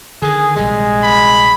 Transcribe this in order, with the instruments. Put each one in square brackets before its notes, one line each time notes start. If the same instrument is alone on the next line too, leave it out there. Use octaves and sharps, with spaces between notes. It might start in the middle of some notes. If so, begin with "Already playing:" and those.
[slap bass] D3 D#3 [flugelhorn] G#4
[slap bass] A#1 C3 G3 [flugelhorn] G#3
[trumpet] B5